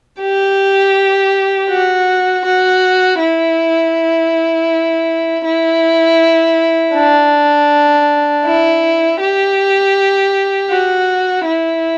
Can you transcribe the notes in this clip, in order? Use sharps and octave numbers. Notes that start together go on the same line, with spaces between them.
G4
F#4
F#4
E4
E4
D4
E4
G4
F#4
E4